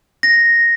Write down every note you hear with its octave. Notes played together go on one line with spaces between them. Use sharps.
A#6